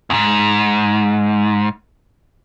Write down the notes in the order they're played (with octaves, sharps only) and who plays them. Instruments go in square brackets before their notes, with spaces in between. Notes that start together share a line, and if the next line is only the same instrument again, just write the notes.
[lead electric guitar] E2 G#2